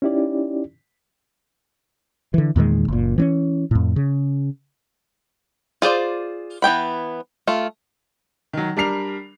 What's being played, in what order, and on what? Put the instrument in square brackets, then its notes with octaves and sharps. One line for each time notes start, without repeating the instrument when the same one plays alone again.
[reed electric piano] C#4 D#4 E4 G4 D5
[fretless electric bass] D3 E3
E2 A#2 D#3 G#3
F#1 A#2
E3 C4 C#4
F2 A2
C#3
[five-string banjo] F4 G#4 C5 D5
E3 B3 G5 B5
A3 F4
[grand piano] D#3 F#3
G3 D4 A#4 C7 F7